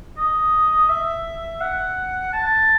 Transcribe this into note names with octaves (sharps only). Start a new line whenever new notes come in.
D#5
E5
F#5
A5